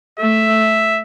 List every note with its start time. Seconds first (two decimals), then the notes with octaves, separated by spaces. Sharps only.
0.19 A3 E5